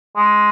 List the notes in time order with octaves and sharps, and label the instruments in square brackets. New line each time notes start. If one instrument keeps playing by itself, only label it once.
[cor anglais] G#3